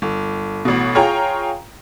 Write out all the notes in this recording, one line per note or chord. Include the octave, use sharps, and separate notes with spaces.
G1
A1 B2
F4 G#4 C#5 G5 A#5